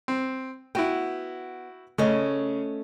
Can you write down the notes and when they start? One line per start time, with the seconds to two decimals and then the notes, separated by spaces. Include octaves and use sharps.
0.08 C4
0.75 B3 E4 F#4 G5
1.98 C#3 A3 C#4 D#5